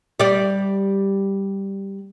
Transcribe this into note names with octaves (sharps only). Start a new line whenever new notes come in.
G3 D5